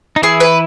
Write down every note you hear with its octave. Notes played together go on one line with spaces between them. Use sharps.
D#4
E3 E4 G#4
B4